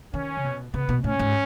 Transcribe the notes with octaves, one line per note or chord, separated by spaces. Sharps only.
D#3 C#4
C#3
B2
C#3 B3
B2
A2 C#4
G#2